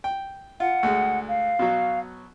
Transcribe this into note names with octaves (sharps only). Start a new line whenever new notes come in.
G5
F4 F#5
D2 G#3
F5
B2 F#3